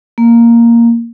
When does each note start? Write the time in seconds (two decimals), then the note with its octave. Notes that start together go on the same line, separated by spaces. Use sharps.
0.18 A#3